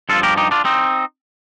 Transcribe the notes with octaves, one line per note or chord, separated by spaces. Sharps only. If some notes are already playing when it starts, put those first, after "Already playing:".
G2 F3 F4 A4
G4 A#4
D#4 G4
D4 F4
C4 D#4